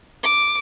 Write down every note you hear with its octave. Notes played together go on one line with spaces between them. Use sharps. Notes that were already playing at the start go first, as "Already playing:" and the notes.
D6